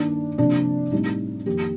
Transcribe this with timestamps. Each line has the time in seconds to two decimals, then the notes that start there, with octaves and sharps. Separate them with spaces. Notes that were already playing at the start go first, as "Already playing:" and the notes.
Already playing: G2 D#3 A#3 D4
0.38 C3 F3 A#3 D4
0.91 A2 G3 C4 D#4
1.46 F2 D#3 A#3 G4